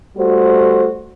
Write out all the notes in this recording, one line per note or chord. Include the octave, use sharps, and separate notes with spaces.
G3 A3 F#4 A4 C5